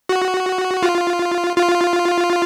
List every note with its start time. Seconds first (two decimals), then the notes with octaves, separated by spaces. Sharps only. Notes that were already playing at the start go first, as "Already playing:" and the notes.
0.09 F#4
0.83 F4
1.56 F4